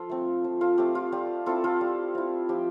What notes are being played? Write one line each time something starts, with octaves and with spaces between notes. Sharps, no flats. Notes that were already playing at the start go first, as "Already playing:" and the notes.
Already playing: F3 F4 A4
A3 C4
F3
F4 A4
A3 C4 G4
F4
G3 G4
C4 E4 F4 A4
F4 A4
G3
C4 E4
F3 G4